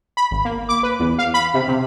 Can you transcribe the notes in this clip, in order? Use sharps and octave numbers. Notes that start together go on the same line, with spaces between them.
B5
G#1
A#3
D6
B4
E2
F5
B5
C3
C3